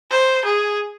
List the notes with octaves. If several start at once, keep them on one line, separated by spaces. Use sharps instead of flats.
C5
G#4